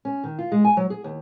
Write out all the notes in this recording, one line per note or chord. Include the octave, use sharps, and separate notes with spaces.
C#4
D#3
F4
G#3
G#5
F#3
G#4
D#2